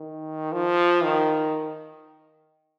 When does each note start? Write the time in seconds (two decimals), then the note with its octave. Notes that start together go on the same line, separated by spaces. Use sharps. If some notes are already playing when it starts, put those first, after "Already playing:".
Already playing: D#3
0.52 F3
1.03 D#3